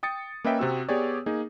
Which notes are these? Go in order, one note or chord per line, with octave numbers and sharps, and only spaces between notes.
G5 D#6 A6 C#7
A#3 C#4 B4 D#5 E5 G5
C3 C4 F#4 E6
B3 G4 G#4 C#5 D5
A#3 D#4 G#4